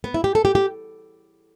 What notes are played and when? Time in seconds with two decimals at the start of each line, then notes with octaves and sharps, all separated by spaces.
0.04 B3
0.14 E4
0.24 G4
0.35 A4
0.45 G4
0.55 G4